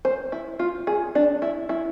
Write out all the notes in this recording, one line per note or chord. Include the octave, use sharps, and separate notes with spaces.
C5
E4
F4
G#4
D4
E4
E4